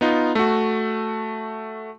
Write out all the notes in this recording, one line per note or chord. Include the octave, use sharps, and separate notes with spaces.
B3 D#4 F4
A3 F#4